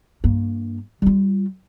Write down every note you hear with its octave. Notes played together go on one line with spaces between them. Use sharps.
G2 A#3
G3 F4